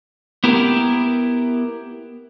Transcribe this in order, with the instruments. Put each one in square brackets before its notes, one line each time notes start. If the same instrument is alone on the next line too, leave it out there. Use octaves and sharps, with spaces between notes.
[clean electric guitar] B3 E4 G4 A#4